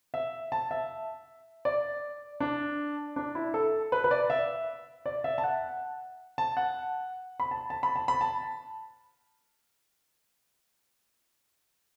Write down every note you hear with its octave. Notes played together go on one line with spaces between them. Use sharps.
E5
A5
E5
D5
D4
D4
E4
A4
B4
B4
D5
E5
D5
E5
A5
F#5
A5
F#5
B5
A5
A5
B5
A5
B5
A5